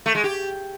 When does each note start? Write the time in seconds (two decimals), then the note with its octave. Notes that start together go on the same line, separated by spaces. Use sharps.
0.06 A3
0.15 G#3
0.24 G4